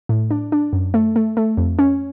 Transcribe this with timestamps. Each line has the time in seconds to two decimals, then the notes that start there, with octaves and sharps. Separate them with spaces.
0.09 A2
0.31 D4
0.52 D4
0.73 F#2
0.94 A3
1.16 A3
1.37 A3
1.57 F2
1.79 C#4